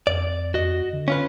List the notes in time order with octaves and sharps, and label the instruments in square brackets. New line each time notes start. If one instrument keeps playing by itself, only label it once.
[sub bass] F2 [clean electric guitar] D5
[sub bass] F2 [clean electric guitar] F#4 D#5
[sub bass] D3
[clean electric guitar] C#4 F4 B4